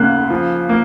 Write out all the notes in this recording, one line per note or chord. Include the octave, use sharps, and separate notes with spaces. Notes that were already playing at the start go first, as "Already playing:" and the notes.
Already playing: C#3 A#3 F#6
F3
A#3